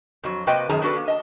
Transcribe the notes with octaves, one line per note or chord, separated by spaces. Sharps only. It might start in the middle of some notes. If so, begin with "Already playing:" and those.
F2 F#3
C3 A#3 F#4 B4 D#5 G5
F#2 D#3 G#4 A5 A#5
B3 D4 F#4 A4 B4
A#3
D#5 A5